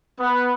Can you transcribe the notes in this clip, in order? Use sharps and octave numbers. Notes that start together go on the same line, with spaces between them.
B3